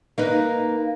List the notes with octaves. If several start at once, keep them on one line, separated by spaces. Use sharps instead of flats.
A#3 D#4 B4